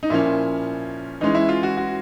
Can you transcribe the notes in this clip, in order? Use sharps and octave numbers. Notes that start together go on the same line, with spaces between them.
D#4
A#2 F3 A#3 C#4 E4
E3 G#3 C#4 D#4
E4
F4
F#4
F#4